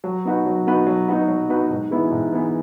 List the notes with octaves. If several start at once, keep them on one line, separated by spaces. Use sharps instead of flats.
F#3
B3 D#4 F#4 B4
F#3
B3 D#4 F#4 B4
F#3
B3 D#4 F#4 B4
F#3
B3 D#4 F#4 B4
G#2
E3 G#3 B3 E4
G#2
E3 G#3 B3 E4